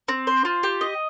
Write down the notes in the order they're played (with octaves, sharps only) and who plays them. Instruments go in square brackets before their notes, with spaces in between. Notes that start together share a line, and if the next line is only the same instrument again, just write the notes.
[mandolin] C4
C5
F4
G4
D#5